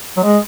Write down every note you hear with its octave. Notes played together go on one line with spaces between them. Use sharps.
F#3
G#3